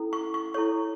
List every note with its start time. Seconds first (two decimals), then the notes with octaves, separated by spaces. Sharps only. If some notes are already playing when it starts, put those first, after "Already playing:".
Already playing: C#4 E4 A4
0.13 C#6
0.34 C#6
0.54 E4 A4 C#5 C#6